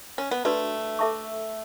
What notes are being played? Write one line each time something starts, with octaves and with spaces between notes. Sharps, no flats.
C#4
B3
A3 D4 F#4 B4 D5
A4 E5 A5 C#6